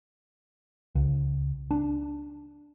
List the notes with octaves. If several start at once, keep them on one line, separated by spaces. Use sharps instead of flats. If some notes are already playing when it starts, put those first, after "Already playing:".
C#2
D4